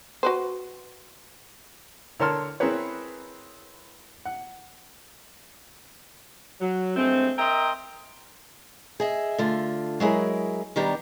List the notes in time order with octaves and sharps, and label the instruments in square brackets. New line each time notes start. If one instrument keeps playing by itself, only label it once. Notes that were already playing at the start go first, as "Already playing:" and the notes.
[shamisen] F#4 B4 C5
[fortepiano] D3 A#4 C#5 A5 C6 F6
C4 E4 G#4 A#4 B4 C#5
F#5
[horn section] F#3
G2 G#3 A3 C4
A#4 D#5 E5 G5 A#5 C6
[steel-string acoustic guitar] G#4 D#5 E5
D3 A3 F4
F#3 G#3 E4 G#4 A#4
D#3 G3 B3 D4 G4 A#5